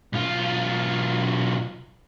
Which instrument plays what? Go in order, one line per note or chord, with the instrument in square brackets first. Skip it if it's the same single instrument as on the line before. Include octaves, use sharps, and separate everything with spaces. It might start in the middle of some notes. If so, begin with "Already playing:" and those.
[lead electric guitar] B1 F4